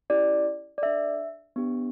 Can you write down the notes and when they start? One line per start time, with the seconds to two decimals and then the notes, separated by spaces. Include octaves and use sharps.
0.10 C#4 E4 G4 D5
0.78 D5
0.82 D4 A4 E5
1.56 B3 D4 G4